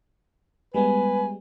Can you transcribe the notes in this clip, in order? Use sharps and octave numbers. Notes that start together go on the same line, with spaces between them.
G3 G#3 B3 B4 G#5